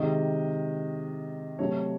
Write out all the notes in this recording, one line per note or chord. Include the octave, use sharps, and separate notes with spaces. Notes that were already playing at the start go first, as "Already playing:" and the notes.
Already playing: C3 D#3 G#3 D#5
C3 F#3 A3 C#5